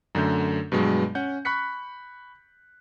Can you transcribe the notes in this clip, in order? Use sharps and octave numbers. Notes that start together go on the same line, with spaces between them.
F#2 D3 A3 G6
G2 B2 F#3 G#3
C#4 F#5 G6
B5 C#6 F#6 B6 C#7